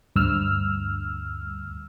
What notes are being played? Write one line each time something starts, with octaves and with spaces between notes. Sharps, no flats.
D2 G2 E6 F6